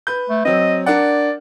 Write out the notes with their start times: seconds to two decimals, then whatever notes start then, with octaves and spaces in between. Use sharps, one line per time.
0.07 B4 G6
0.29 A3
0.45 F#3 C4 D#5
0.86 D4 A#4 D5 F#5